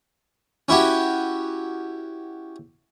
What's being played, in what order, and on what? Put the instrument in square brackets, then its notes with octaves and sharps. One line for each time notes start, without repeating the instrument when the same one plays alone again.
[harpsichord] C#4 E4 F#4 G4